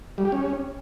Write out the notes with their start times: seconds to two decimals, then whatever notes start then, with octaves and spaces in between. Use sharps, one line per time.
0.18 G3
0.25 G4
0.32 C#4